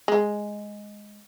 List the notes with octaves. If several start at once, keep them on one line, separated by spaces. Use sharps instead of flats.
G#3